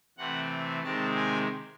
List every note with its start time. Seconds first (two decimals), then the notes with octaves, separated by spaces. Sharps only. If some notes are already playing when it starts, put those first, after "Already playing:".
0.18 C3 E3 A3 C4 F#5
0.83 C3 D#3 G#3 C4 A5
1.16 G#5